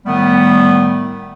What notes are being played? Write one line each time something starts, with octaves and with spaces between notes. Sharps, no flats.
A2 D#3 G3 A3 B3